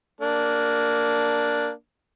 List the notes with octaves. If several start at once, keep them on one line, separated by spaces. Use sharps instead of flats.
A#3 D4